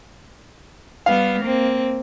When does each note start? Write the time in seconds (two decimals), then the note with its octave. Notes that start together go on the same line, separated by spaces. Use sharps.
1.06 G3 B3 F5
1.43 A#3 C4